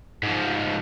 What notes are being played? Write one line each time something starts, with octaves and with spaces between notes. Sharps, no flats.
G#2 F3